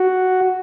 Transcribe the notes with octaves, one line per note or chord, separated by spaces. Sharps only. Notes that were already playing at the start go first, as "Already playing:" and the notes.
Already playing: F#4